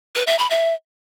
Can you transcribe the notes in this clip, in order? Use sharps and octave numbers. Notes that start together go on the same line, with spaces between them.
B4
E5
B5
E5